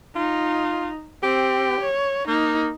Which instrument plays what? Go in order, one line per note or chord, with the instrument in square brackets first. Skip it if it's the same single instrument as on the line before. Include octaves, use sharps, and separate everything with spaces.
[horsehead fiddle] D#4 [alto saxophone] F4
[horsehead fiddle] C4 [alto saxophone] G4
[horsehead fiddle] C#5
[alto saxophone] A#3 [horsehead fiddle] D#4